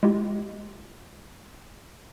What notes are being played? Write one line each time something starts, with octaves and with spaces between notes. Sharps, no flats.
G#3 E4 F4 G4